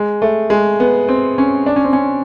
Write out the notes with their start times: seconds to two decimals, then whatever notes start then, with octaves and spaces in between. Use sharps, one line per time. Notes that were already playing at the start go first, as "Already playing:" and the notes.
Already playing: G#3
0.22 A3
0.50 G#3
0.80 B3
1.09 C4
1.38 C#4
1.66 D4
1.76 C#4
1.85 C4
1.93 C#4